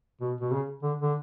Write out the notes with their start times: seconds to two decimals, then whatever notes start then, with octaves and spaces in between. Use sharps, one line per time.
0.21 B2
0.41 B2
0.51 C#3
0.83 D3
1.02 D3